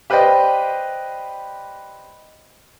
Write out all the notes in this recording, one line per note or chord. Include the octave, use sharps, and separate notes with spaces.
G4 B4 C5 D5 D#5 G5